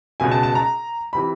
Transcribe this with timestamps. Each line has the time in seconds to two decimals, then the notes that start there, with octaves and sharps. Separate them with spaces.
0.20 C#2 B2 G#5
0.31 A5
0.43 A5
0.55 A#5
1.13 C3 E3 B5